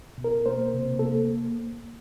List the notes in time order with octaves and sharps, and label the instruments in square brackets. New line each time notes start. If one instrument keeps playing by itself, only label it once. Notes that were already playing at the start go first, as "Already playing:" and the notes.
[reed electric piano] B2
A#4
A#3 C5
C3
A4
A#3